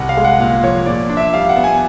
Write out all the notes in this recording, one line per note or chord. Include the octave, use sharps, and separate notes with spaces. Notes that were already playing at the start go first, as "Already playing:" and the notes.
Already playing: C2 F#5
F5
G#3
F#5
A#2 F5
F3 C#5
A#2 D5
D4
E5
G3 F5
F#5
B3
G#5